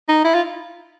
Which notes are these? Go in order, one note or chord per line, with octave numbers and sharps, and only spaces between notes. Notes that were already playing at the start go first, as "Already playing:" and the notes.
D#4
E4
F4